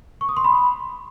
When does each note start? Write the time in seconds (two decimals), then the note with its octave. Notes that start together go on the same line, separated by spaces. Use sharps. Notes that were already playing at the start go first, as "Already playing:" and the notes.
0.21 C#6
0.29 D#6
0.37 C6
0.44 B5